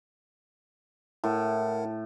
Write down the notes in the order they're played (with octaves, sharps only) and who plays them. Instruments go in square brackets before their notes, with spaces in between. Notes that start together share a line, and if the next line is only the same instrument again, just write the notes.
[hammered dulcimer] A2 [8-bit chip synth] E4 A#4 F#5